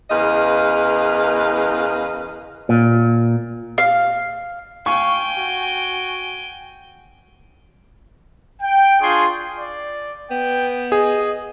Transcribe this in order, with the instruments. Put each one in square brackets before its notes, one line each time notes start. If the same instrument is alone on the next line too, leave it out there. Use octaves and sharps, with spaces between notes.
[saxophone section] E2 C#3 A#4 B4 D#5 F5
[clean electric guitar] A#2
[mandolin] F5
[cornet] F5 [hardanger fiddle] G5 G#5 [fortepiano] C#6
[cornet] F#4
[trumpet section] G5
D4 F4 G#4 C6 C#6
[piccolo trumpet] D5
[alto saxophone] B3 [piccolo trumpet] G5
[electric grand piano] G#4 [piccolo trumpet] D#5